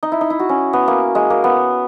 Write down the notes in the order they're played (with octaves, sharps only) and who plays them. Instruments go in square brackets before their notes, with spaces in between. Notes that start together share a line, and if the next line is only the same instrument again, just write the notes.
[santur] D#4
E4
D#4
E4
F#4
C#4
B3
A#3
G#3
A#3
B3